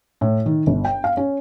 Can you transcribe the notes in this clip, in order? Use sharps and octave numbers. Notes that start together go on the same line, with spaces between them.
A2
D#3
G1
G5
F5
C#4